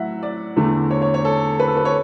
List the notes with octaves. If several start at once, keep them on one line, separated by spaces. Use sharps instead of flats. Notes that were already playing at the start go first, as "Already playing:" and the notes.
Already playing: A2 F#3 E5 F#5
D5
E2 D3 A3
C#5
C#5
C#5
A4
B4
A4
B4
C#5